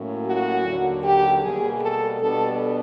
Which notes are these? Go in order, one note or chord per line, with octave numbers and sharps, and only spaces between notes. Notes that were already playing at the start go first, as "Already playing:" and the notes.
Already playing: A2 F#3 A#3 C#4
F#4
D#2 D3 F#3 A#3
G4
B2 G3 A#3 G#4
A4
B2 G3 B3 D4 A4